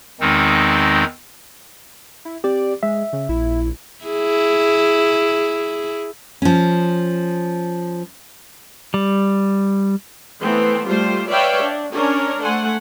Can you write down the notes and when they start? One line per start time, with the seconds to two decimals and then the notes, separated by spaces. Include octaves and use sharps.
0.21 E2 D#3 G#3 C4 D#4
2.25 E4
2.44 C4 G4 D5
2.83 G#3 E5
3.13 C#3
3.29 A#1 E4
4.05 E4 G#4
6.42 F3 C#4
8.94 G3
10.40 E3 A3 B3 C4
10.87 G3 A3 F4 G4 C5
11.28 B4 C#5 D5 E5 F5 G5
11.62 D4
11.94 C#4 D4 A#4 C#5
12.43 A3 C5 F#5 G#5